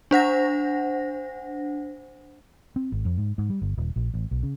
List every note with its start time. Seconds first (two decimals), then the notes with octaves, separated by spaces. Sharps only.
0.11 D4 C5 F#5 A#6
2.76 C4
2.92 G#1
3.05 F2
3.18 G#2
3.38 G#2
3.50 G3
3.62 G1
3.78 D#1
3.96 A#1
4.14 A1
4.31 B1
4.43 C#3